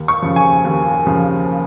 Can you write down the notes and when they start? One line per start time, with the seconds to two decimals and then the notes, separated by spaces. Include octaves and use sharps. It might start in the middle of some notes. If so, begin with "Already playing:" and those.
Already playing: D#2
0.08 C#6
0.22 C#3 F3
0.36 G#5
0.65 D#2
1.07 C#3 F3